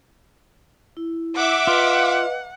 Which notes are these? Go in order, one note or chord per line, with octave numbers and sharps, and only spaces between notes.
E4
E5 F#5 D6
F4 B4 D#5 F5